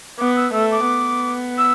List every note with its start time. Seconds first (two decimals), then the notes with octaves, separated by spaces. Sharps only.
0.18 B3 D6
0.36 E6
0.53 A3 E6
0.71 D6
0.88 B3
1.58 E6